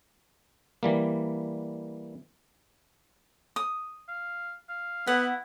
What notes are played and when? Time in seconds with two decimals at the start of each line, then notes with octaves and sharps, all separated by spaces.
0.83 E3 G3 A#3
3.56 D#6
4.08 F5
4.69 F5
5.07 B3 E4 F#5